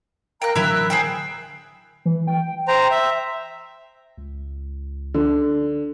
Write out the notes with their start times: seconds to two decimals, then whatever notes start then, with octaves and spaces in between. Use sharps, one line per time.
0.42 A#4 F5 G5 A#5 F#6
0.56 A1 D3 F#3 E4 A#4 E5 F#6
0.90 G#4 C5 G5
2.05 E3
2.27 G5
2.68 C5 G5 A#5
2.91 E5
4.18 C#2
5.14 D3